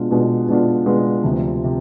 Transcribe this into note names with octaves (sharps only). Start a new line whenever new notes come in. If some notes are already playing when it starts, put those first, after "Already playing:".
Already playing: B2 G#3 B3 D4 F4
B2 G#3 B3 D4 F4
B2 G#3 B3 D4 F4
B2 G#3 B3 D4 F4
D2 C3 F3
C3